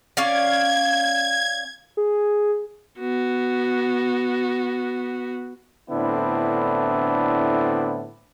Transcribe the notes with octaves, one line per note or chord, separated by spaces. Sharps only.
C#4 D5 F5 G#6
G#4
B3 F#4
A2 D3 B3 C4 D4 E4